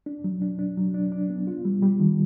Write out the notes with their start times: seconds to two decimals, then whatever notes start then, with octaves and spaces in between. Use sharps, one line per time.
0.06 D4
0.24 F#3
0.42 D4
0.59 D4
0.77 F#3
0.94 D4
1.12 D4
1.30 B3
1.47 F4
1.65 G3
1.82 G3
2.00 D#3